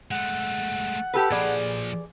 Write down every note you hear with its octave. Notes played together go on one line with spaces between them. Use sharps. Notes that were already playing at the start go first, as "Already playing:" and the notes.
G#3 A3 F#5
G4 A4 B4
A#2 F3 G#4 D5